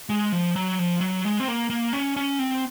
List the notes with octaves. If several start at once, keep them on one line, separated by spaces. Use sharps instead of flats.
G#3
F3
F#3
F3
F#3
G#3
C4
A#3
A#3
C#4
C#4
C4